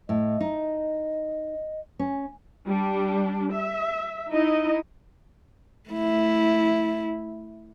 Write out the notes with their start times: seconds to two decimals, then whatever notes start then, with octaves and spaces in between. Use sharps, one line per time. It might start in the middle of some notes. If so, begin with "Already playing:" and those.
0.09 A2 D#5
0.41 D#4
1.99 C#4
2.68 G3 D4
3.55 E5
4.31 D#4 E4 D#5
5.90 A3 E4